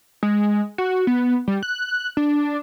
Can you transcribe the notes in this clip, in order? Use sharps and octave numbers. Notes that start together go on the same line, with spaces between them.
G#3
F#4
B3
G3
F#6
D4